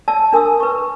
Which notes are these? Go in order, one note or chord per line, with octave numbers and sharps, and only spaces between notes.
D5 A5 E6
D4 A#4 G#5 D#6 E6
B4 C#6